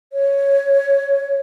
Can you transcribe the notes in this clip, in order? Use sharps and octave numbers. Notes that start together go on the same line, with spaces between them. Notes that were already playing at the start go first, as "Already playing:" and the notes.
C#5